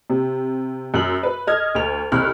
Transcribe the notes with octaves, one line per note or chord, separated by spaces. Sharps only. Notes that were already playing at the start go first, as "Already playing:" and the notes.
C3
F#2 F#7
B4
A4 D#5 F6 G#6
D2 F7
F1 C2 F6 F#6